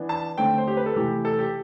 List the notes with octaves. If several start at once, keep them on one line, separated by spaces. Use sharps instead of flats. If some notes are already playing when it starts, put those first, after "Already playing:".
Already playing: E3 B3 D4
A5
D3 A3 C4 G5
C5
G4
B4
A4
C3 E3 A3 G4
A4
G4